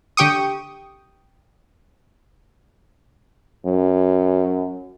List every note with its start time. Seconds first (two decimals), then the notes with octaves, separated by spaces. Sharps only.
0.17 D3 G4 G5 C#6 D#6
3.66 F#2